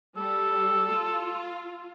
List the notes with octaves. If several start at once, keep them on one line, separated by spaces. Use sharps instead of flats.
G3 A4
F4